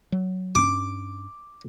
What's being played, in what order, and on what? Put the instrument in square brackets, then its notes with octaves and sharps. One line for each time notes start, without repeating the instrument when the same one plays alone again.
[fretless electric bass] F#3
[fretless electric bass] G2 C#4 [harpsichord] D6